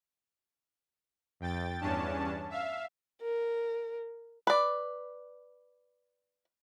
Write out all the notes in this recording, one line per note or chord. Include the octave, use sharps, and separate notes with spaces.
F2 G5 A6
E2 G2 C#4 D4 A5
E5 F5
A#4
B4 D5